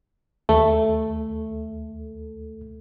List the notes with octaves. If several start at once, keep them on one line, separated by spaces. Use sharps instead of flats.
D#2 A3 A4